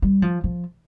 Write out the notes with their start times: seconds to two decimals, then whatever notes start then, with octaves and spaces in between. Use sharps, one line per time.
0.02 G3
0.22 F3
0.44 F3